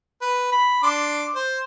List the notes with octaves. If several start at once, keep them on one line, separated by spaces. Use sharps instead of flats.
B4
B5
D4 C6 D6
C5